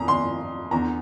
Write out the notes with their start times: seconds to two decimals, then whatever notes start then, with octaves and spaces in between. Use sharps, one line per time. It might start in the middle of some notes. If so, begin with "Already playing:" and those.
Already playing: F2 A#5
0.08 C6
0.71 E2 D3 A#5